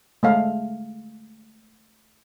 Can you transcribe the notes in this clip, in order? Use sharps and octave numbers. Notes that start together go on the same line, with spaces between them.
G#3 A3 F5